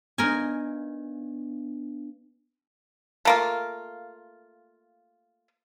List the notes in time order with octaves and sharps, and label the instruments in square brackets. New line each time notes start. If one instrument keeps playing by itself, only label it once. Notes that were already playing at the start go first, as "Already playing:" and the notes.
[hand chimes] B3 D4 [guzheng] D#4 A#4 G#5
[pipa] A3 A#3 F4